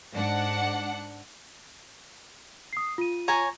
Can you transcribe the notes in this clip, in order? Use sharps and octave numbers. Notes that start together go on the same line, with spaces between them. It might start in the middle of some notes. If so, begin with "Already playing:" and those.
G#2 D4 F#5
D#6 C7
F4 D#7
C#5 G#5 A#5